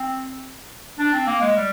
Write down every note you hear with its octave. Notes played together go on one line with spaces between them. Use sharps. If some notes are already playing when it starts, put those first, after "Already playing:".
Already playing: C4
D4
C4
A#3
G#3
G3